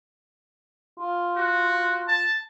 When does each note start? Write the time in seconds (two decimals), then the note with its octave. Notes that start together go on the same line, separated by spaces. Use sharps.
1.00 F4
1.36 F#4
2.08 A5